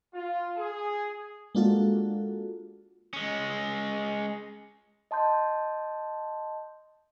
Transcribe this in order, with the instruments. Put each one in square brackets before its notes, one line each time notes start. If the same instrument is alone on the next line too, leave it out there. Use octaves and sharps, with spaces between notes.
[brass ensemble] F4
G#4
[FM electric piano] G#3 A#3 D4 F4 F#4 A4
[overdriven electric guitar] G#3 C#4
[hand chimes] D#5 A5 C6 G6